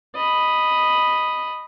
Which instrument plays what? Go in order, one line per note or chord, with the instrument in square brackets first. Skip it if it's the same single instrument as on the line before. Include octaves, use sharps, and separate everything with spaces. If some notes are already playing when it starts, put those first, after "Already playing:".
[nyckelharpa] D#5 B5